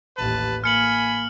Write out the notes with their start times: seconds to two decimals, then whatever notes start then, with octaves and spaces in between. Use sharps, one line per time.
0.17 A1 D#2 B4 A5
0.64 A#3 G#5 B5 F6 C#7 F#7